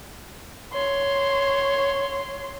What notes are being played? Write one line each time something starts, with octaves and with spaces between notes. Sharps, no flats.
C#5 C6